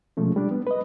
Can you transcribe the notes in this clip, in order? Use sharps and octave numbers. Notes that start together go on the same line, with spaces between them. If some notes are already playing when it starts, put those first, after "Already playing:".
B2 F3 G#3 A3 C#4
G3 D4
B3
B4 D#5